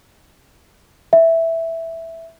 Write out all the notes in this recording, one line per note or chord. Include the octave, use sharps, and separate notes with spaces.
E5